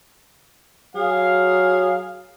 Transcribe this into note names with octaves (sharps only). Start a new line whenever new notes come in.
F#3 G#4 F5